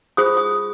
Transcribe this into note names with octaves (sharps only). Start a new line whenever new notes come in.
F4 G#4 C5 D#6
D#6